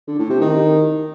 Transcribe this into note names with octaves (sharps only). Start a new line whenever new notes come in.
D3
A2
C3
D#3